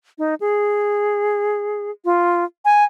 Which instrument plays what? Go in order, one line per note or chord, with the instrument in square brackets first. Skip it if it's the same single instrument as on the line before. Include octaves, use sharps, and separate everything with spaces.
[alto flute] D#4
G#4
F4
G#5